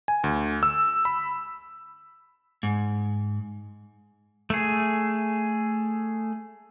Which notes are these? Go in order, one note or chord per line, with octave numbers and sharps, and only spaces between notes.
G#5
D2
E6
B5
G#2
A3 G#4